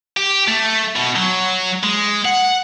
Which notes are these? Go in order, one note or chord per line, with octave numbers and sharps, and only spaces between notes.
G4
A3
B2
F#3
G#3
F#5